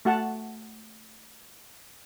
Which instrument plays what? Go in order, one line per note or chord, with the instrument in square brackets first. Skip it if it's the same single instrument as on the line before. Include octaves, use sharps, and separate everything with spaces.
[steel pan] A3 F#4 F#5 A5